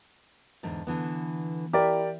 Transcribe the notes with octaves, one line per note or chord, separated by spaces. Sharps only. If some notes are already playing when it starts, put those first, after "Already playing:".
E2 G#2 D3
D3 E3 B3
E4 G4 A#4 D5